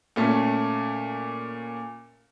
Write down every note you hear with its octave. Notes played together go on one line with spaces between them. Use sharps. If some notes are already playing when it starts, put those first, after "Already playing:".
A#2 A3 C#4